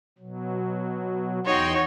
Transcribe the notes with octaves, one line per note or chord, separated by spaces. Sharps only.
B2 F#3
E2 D#4 F#4 C#5 G5 C6